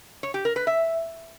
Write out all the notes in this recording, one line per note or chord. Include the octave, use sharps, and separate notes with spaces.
C#5
G4
A#4
B4
E5